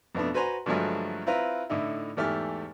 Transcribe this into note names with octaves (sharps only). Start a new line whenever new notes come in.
F2 B2 A3 B3 D4
F#4 B4 C5 G#5 A#5 C6
G2 D3 F3 F#3 G#3 A3
C4 E4 F4 B4 A#5
A2 D3 D#4 E4
E2 G#2 A3 G4 E6 F6